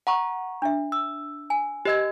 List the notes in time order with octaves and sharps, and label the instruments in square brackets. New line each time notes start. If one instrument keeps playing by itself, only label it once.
[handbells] F#5 A#5 C#6
[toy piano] D4 E5
[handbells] E6
[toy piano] G#5
[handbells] G4 D#5 G#6 [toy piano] A#4 C5